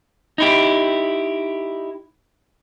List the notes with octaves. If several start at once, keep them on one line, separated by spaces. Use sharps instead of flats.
D#4 E4 G4